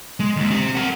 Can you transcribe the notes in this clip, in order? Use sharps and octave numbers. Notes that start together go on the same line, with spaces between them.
G#3
D#2
C4 G4
A#4 F#5